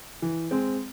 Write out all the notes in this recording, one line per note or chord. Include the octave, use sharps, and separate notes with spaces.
E3
G#3 C4